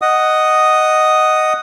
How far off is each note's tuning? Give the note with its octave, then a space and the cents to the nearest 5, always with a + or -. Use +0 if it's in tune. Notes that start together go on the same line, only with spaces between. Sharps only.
D#5 +0 F#5 +5 D#6 +0